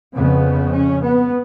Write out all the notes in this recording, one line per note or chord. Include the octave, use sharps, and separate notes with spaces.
F2 C#3 B3
C#4
B3